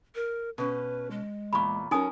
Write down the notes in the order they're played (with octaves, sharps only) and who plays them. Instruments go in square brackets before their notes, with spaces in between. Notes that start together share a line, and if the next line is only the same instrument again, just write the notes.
[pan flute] A#4
[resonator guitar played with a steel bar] B2 C#4 [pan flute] B4
[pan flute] G#3
[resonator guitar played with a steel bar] E2 A#2 [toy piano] B5 C#6
[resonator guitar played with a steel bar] F#3 C#4 A#4 [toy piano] D#4 G#5 D#6